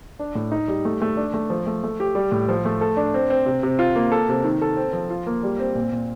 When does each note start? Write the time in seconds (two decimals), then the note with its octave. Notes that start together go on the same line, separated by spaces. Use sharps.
0.19 D4
0.35 A2
0.52 D#4
0.68 G3
0.85 A3
1.02 A3
1.17 D4
1.34 A3
1.50 F3
1.66 A3
1.84 A3
2.00 G4
2.15 G3
2.32 A2
2.49 F3
2.65 A3
2.81 A4
2.97 D4
3.14 C4
3.30 C4
3.46 C3
3.63 C3
3.79 F4
3.95 A#3
4.12 A4
4.29 C3
4.44 D#3
4.62 A4
4.77 C4
4.93 F3
5.10 F4
5.26 A#3
5.43 G3
5.59 C4
5.75 A#2
5.92 A#2